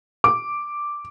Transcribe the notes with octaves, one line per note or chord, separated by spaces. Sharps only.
D6